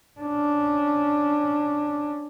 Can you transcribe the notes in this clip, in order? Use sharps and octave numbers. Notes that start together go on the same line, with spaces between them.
C#4 D4